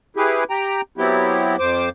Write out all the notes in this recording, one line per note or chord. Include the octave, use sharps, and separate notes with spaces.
E4 G4 G#4 B4
G4 G5 A#5
F#3 B3 C4 E4 G4
F2 C5 D6